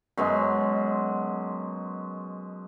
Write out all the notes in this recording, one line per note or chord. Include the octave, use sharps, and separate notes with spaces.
F#2 B2 G#3 C6